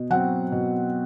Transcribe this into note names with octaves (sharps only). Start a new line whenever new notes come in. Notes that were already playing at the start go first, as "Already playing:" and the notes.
Already playing: B2
F#3 C4 F#5
B2